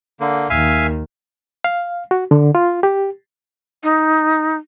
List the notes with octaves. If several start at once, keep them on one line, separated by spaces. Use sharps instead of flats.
D3 A#3
D#2 D#3 E5 F5 G#5
F5
F#4
D3
F4
G4
D#4